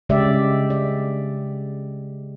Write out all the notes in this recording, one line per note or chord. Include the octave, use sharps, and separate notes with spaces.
C#3 G#3 G4 D5 E5
D5